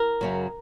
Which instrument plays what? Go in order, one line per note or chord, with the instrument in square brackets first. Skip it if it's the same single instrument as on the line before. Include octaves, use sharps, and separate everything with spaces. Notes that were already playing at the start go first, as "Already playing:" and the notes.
Already playing: [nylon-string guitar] A#4
F#2 C#3 F#3